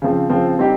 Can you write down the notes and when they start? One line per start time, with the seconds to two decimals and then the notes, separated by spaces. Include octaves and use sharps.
0.02 C#3 F3 C4
0.30 C#3 F3 C4
0.58 G3 C4 D#4 G4